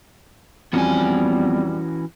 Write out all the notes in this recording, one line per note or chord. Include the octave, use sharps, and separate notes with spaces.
F2 E3 G3 B3 C#4 F#4 G#5